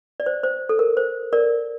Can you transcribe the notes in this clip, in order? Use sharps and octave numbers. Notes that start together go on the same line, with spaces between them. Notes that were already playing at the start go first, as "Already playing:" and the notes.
D5
C5
C5
A4
A#4
C5
A#4 D5